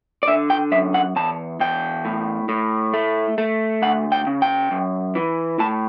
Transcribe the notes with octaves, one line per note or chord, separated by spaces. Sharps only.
D5
D3 E5
G5
F#2 E5
F#5
E2 A5
E2 G5
A2
A2
A3
A3
D2 F#5
G5
C#3
G5
F#2
E3
A2 A5